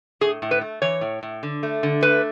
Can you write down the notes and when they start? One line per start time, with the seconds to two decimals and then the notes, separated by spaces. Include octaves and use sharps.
0.21 A2 G#4
0.42 A2
0.51 B4
0.61 A3
0.82 E3 C#5
1.01 A2
1.23 A2
1.43 D3
1.63 A3
1.83 D3
2.03 A3 B4